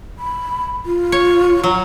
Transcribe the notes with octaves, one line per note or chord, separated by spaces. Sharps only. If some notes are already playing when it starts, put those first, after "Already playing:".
B5
F4
C#5
F#3 A#5